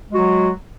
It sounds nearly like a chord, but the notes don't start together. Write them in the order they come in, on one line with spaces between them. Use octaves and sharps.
G#3 F#4 F#3